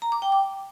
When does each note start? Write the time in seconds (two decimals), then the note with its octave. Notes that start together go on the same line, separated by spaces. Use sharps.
0.02 A#5
0.12 D6
0.22 G5
0.32 D6